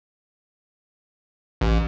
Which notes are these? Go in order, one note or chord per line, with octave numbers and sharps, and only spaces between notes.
A1